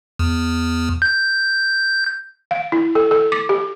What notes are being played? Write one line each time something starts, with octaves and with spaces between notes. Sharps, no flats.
E2
G6
F5
E4
A4
A4
D6
G4